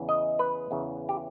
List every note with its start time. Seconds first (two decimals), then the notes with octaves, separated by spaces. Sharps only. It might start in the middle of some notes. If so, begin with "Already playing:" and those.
Already playing: E2 C#3 E3
0.09 D#5
0.39 B4
0.71 E2 C#3 E3
1.09 G4